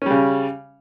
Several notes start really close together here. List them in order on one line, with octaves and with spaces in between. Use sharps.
C#4 G3 C#3